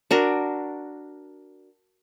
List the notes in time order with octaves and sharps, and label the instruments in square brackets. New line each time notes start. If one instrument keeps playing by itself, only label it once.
[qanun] D4 F#4 A#4